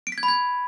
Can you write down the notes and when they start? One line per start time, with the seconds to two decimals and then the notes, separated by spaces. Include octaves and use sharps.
0.07 D7
0.12 B6
0.18 G#6
0.23 B5
0.28 G#6